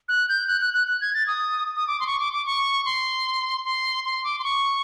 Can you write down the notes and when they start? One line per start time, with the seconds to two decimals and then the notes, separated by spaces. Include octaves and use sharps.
0.09 F#6
0.29 G6
0.48 F#6
0.61 F#6
0.74 F#6
0.87 F#6
1.01 G#6
1.14 A6
1.27 D#6
1.76 D#6
1.87 D6
2.00 C6
2.07 C#6
2.20 D6
2.33 D6
2.46 C#6
2.85 C6
3.65 C6
4.05 C6
4.24 D6
4.39 C6
4.44 C#6